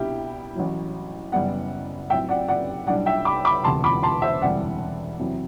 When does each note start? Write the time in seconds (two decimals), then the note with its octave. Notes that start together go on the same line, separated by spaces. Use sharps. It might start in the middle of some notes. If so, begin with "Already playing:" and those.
Already playing: C2 B2 G3 D4 E4 G4
0.55 A1 A2 F#3
1.32 F#1 F#2 E3 G3 B3 D5 F#5
2.10 A2 F#3 C4 E5 G5
2.29 D5 F#5
2.48 D5 F#5
2.87 B1 A2 G3 D4 D5 F#5
3.06 E5 G5
3.25 B5 D6
3.45 B5 D6
3.64 E1 D2 C3 A5 C6
3.84 B5 D6
4.03 A5 C6
4.22 C5 E5
4.42 E1 D2 C3 E3 G3 D5 F#5
5.19 E2 C3 F#3 C4 E4